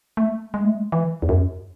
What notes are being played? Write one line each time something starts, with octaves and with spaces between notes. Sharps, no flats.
A3
G#3
A3
G#3
E3
E2
F#2